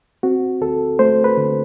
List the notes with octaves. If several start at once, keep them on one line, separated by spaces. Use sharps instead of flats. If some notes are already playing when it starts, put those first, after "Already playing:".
C4 F#4
D2 A4
A3 C5
B4
D3